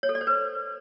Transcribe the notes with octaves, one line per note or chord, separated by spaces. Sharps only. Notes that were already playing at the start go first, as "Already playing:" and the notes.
C#5
A4
D5
C5
B4